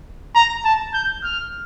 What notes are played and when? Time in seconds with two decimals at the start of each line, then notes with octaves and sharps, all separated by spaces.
0.35 A#5
0.65 A5
0.94 G6
1.23 F6